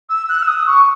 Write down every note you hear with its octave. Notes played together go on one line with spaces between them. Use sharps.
E6
F#6
E6
D#6
C#6